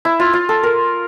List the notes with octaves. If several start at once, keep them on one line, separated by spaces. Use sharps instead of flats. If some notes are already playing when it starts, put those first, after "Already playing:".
E4
F4
F4
A4
A#4